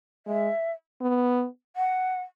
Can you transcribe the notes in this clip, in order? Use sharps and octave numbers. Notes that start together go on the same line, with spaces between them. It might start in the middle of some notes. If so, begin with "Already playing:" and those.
G#3 E5
B3
F#5